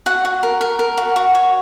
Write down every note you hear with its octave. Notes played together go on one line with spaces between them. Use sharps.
F#4 F#5
F#4
A#4
A#4
A#4
F#4
F#4
C#5